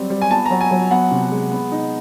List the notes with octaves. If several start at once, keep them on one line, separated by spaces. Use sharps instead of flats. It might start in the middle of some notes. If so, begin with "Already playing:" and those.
Already playing: F#3 G3 C4
G3
G#5
B3 A5
A#5
F#3
G#5
F#3
B3 F#5
C3
G#3
B3
D#4